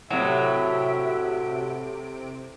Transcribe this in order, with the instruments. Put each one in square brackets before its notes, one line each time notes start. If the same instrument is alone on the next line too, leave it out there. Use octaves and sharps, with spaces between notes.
[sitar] A2 [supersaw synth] C3 D7 [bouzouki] F#3 [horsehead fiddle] E5